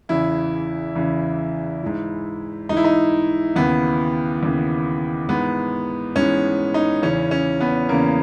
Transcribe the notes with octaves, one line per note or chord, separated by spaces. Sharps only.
E2 C#3 E3 E4
E2 C#3 E3
G#2 E3
G#2 E3 D#4
E4
D#4
D#2 C#3 E3 B3
D#2 C#3 E3
G#2 E3 B3
G#2 E3 C#4
D#4
E2 C#3 E3 C#4
C#4
B3
E2 C#3 E3 A#3